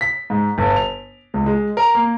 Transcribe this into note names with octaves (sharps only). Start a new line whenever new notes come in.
B6
G#2
G1
F7
C#2
G#3
A#4
A#3